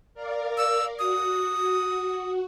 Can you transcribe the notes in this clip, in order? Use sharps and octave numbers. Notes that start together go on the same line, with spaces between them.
A#4 D5 F5
E6
F#4 D#6